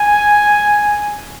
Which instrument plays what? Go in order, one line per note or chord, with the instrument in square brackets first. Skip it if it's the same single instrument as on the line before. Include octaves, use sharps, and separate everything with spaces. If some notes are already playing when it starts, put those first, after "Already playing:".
Already playing: [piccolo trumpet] G#5